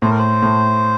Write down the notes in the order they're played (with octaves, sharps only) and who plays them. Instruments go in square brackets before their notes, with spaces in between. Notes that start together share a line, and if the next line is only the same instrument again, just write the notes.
[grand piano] A2 [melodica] C5
[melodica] A#4
C5
[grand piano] A2